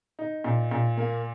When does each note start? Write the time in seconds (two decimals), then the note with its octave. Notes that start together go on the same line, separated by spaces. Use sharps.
0.19 D#4
0.44 A#2
0.71 A#2
0.97 A#3